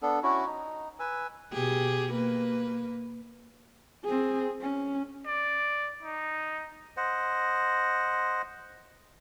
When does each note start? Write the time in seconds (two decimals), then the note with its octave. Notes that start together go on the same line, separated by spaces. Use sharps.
0.02 B3 D4 A4
0.23 C#4 E4 F#4
0.46 D#4
0.99 B4 G#5 E6
1.53 B2 G4 G#4
2.13 A#3 B4
4.04 C4 G#4
4.61 C#4
5.26 D5
6.03 D#4
6.97 C5 D#5 F#5